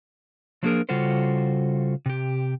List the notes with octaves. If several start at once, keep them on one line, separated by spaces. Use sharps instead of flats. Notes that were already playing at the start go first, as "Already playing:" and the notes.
F3 F#3 A#3 D4 G#4 A#4
C#3 G3 F4 F#4 A4 C5
C3 G4